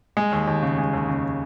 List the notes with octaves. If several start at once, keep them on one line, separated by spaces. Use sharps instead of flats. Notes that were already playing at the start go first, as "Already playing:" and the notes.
G#3
D#2
D#2
C#3
G#3
D#2
C#3